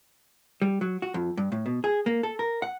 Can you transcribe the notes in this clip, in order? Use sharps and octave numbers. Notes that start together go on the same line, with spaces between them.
G3
F#3
F#4
F2
G2
A2
B2
G#4
A#3
A4
A#4
F#5